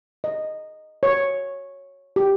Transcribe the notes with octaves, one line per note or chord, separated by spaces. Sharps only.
D#5
C#5
G4